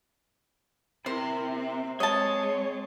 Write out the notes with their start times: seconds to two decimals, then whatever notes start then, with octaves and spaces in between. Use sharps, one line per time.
1.06 C3 E4 A#4 C5
1.53 C4
2.00 G#3 C4 C#5 D#5 A5